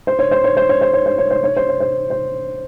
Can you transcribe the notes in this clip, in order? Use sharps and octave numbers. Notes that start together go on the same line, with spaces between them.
C5
C#5
C5
C#5
C5
C#5
C5
C#5
C5
C#5
C5
C#5
C5
C#5
C5
C5